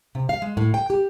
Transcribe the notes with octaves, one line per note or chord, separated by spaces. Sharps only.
C3
F5
G#3
A2
G5
G4